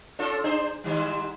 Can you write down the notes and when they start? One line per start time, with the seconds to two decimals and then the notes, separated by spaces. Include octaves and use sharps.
0.19 C#4 F4 A4
0.44 D4 G#4 C5
0.84 G#2 D#3 G3